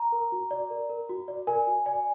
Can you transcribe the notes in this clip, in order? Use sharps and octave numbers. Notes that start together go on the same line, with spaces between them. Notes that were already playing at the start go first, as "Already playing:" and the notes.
Already playing: A#5
A#4
F#4
D5
A#4
A#4
F#4
D5
A#4 G#5
F#4
D5 G#5